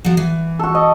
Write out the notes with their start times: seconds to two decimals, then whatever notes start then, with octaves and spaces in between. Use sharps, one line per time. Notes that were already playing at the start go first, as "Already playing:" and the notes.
0.05 F3 F#3
0.17 E3
0.59 F#4 A4
0.75 D#5